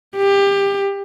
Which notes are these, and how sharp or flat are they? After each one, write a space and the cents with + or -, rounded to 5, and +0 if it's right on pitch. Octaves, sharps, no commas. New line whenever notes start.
G4 +20